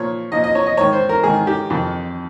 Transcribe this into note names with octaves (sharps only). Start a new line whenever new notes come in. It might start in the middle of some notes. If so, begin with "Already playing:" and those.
Already playing: A#2 F3 C#5
A#2 F3 D#5
D#5
C#5
D#5
G#2 D#3 C#5
C5
A#4
G#2 D#3 G#4
G4
F2 D#3